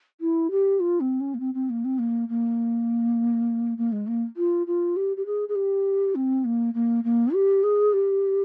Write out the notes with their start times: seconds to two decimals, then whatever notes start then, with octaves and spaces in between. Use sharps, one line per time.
0.21 E4
0.51 G4
0.80 F4
1.00 C4
1.20 C#4
1.34 A#3
1.40 C4
1.54 C4
1.70 A#3
1.85 C4
1.99 A#3
2.29 A#3
3.78 A#3
3.92 G#3
4.07 A#3
4.37 F4
4.67 F4
4.96 G4
5.17 G4
5.26 G#4
5.49 G#4
5.55 G4
6.15 C4
6.45 A#3
6.74 A#3
7.04 A#3
7.34 G4
7.63 G#4
7.93 G4